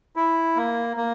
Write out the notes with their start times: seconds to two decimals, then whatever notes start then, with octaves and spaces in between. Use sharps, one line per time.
0.16 E4
0.56 A#3
0.97 A#3